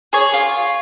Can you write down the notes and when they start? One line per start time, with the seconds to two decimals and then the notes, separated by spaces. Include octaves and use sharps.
0.13 G#4 C#5
0.34 F4